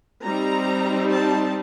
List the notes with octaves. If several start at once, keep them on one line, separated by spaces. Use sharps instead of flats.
G3 C4 D#4 A#5
A5